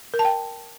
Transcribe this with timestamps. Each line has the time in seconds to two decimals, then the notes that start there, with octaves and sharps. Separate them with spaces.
0.14 A#4
0.19 A5
0.25 G5